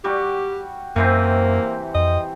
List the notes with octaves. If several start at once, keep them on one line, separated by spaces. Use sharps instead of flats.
G3 F#4 G4
F#2 C3 E3 A#3 C4
F2 D#5